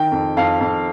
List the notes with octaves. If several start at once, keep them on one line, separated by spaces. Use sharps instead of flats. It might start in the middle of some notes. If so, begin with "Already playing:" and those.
Already playing: D#3 G5
F2
F2 F5
F2